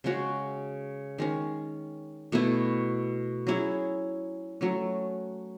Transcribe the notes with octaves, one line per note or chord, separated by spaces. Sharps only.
C#3 G#3 C#4 F#4
D#3 G#3 C#4
B2 A3 E4 B4
F#3 C#4 E4 G#4
F#3 A3 C#4